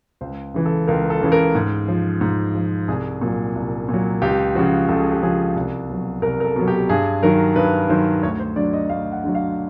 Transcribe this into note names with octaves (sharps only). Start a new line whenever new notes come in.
C#2 C5
C#3 E3
A4
C#2 A#4
A4
C#3 E3
A#4
G#2
F3
G#2
F3
C2 G#4
A#2 F#3
C2
A#2 F#3
C#2 G4
C#3 F3 F#4
C#2 A4
G#4
G4
C#3 F3 G#4
C2
B2 F#3
C2 A#4
A#4
A4
B2 F#3
G4
G2 G#4
D#3 F#3 A#4
G2 B4
D#3 F#3 C5
D2 C#5
C5
D3 F#3 D5
D#5
D2 F5
F#5
D3 F#3
F5